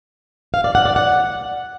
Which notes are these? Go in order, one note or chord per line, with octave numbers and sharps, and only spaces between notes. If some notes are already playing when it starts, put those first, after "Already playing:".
F5
D5
F#5
D5
F#5